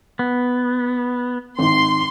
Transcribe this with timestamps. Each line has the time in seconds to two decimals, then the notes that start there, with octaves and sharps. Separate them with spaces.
0.19 B3
1.59 G#1 D#3 C6